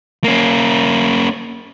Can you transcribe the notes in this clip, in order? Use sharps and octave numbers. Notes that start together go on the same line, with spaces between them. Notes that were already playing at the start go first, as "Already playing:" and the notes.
A#3 C#4